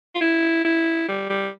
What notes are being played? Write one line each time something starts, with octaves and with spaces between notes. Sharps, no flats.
F4
E4
E4
G3
G3